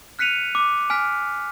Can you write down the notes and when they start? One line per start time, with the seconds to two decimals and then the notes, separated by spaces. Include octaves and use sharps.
0.19 F6 F#6 B6 C#7 D#7 F7
0.55 D6
0.90 G#5 F6 B6